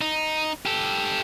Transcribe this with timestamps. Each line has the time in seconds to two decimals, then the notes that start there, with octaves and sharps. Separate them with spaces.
0.01 D#4
0.66 G4 A4